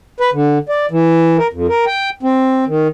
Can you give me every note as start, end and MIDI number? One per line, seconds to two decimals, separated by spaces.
0.20 0.30 71
0.33 0.58 50
0.69 0.86 74
0.91 1.38 52
1.38 1.47 70
1.53 1.67 41
1.69 1.85 70
1.86 2.10 79
2.23 2.65 60
2.67 2.88 51